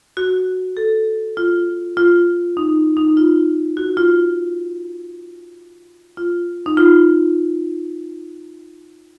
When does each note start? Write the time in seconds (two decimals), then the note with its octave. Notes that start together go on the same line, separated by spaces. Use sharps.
0.17 F#4
0.77 A4
1.37 F4
1.97 F4
2.57 D#4
2.97 D#4
3.17 F4
3.77 F#4
3.97 F4
6.17 F4
6.66 D#4
6.77 F4